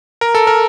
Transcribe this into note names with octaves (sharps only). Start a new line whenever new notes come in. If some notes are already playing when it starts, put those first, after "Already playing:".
A#4
A4
A#4